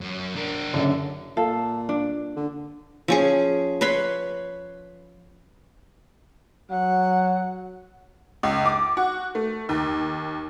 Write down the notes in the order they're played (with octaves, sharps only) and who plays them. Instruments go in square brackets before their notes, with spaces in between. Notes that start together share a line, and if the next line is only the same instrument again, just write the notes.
[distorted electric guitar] F#2
D4 A#4
[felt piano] F#1 F#2 [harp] D3
[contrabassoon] A#2 [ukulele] A4 F5
[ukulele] D4
[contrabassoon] D3
[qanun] F3 C#4 G#4
B4 C#5 B5 C6
[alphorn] F#3 [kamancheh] F#5
[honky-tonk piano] C#2
D6
F#4
A3
D#2